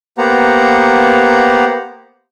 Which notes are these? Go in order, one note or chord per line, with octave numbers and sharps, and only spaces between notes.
A#3 B3 G4 C5 F#5 A#5